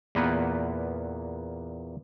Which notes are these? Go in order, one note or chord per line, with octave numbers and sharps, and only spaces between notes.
E2 A#2 A#3 B3 B4 F#5